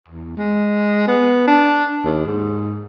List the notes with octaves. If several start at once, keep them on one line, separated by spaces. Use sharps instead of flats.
E2
G#3
B3
D4
D#2
G#2